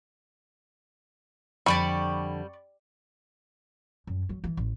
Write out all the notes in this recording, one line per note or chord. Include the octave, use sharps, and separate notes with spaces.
F2 D3 G3 D4 D5 B5 C#6
F#2
F#3
E3
A1